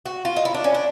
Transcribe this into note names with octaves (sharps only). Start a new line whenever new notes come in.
F#4
F4
D#4
E4
D4
C#4
D4